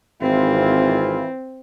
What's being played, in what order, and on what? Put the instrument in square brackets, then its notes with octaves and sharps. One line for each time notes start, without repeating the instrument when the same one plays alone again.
[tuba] G#1 [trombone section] E3 E4 F4 [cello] C4